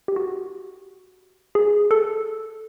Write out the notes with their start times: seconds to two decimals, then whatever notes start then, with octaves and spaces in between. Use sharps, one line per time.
0.08 G4
0.16 F#4
1.55 G#4
1.91 A4